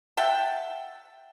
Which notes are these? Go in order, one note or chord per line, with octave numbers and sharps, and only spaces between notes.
E5 F#5 G5 A5